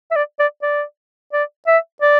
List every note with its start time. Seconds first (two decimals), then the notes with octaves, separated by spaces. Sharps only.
0.11 E5
0.16 D5
0.40 D5
0.63 D5
1.33 D5
1.67 E5
2.02 D5